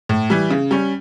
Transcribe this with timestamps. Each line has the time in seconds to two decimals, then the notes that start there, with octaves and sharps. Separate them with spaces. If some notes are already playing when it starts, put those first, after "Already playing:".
0.09 A2
0.30 E3 G3
0.51 C#3
0.71 G3 C#4